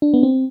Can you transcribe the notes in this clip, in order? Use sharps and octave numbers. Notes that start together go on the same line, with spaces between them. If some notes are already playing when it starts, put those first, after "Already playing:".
D4
B3
C4